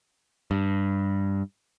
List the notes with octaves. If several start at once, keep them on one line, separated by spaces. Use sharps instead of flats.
G2